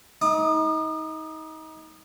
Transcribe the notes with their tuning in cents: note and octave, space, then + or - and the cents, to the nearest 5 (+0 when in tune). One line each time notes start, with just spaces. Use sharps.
D#4 +30 D#6 -40